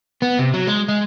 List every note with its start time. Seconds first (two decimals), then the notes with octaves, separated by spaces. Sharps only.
0.22 B3
0.39 C3
0.54 F#3
0.67 G#3
0.88 G#3